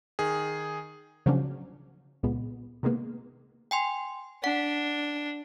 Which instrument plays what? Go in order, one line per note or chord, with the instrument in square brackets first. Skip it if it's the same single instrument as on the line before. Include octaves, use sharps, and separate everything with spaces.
[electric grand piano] D#3 G#4
[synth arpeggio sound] C#3 F3 F#3 A#3 C#4 D4
C#2 A#2 G#3 B3
C3 D#3 G#3 A#3 B3
[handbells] G5 G#5 C6
[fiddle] D4 [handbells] F#5